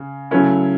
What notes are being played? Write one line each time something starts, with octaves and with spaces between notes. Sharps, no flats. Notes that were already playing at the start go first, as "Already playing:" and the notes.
Already playing: C#3
C#3 F#3 A3 C#4 E4